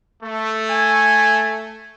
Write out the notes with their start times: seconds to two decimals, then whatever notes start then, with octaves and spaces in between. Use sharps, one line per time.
0.23 A3
0.70 G#5